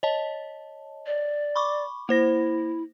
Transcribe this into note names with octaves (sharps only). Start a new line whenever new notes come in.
C#5 D#5 A5
D5
B5 C#6 D6
A#3 E4 C5 A#6